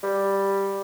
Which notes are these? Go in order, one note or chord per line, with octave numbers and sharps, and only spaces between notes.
G3